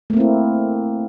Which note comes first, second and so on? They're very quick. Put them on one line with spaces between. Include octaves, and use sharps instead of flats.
A3 A#3 C4 E4